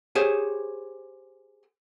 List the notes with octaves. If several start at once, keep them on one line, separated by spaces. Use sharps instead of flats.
G4 G#4 C5 C#5